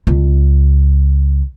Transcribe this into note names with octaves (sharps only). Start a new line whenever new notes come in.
C#2